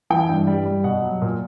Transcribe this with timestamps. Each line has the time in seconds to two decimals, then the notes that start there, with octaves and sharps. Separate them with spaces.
0.10 E3 G5
0.29 G2
0.47 G3
0.66 G3
0.84 B2 F#5
1.02 F#3
1.22 A#2